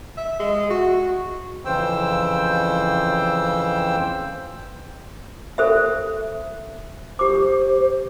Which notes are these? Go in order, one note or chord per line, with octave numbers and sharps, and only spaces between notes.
E5
G#3
F#4
F2 C#3 E3 C5 G5 E6
A4 C5 E5
G4 C5 D6